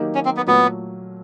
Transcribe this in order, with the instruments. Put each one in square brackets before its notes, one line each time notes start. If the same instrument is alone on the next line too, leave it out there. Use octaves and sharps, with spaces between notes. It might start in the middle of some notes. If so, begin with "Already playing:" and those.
Already playing: [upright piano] D#3 F#3 A#3 D#4 G4
[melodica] C#4
C4
B3
[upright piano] A#2 F#3 A3 [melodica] B3